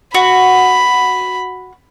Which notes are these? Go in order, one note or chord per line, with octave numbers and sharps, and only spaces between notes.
F#4 B5